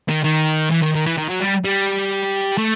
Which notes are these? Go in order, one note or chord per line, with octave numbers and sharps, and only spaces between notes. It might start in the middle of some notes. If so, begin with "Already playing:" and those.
D#3
D#3
E3
D#3
D#3
E3
D#3
F#3
G3
G3
A3